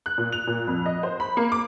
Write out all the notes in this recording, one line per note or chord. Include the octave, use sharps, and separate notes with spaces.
F#6
A#2
F7
A#2
F2
D#5
C5
B5
A#3
D6